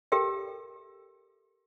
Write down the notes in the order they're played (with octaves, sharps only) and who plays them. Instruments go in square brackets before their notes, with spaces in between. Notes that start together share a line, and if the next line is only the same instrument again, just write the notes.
[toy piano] G4 A4 A#4 E5 G5